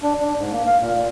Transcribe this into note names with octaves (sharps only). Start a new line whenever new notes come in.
D4
D4
G#2
A#3
F5
A#2
A#2